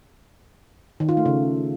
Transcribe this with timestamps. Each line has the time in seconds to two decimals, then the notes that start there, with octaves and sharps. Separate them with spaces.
1.00 D#3
1.09 F4
1.17 A3
1.26 C#3